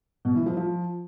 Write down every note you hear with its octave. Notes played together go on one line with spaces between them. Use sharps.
B2
E3
F3
F3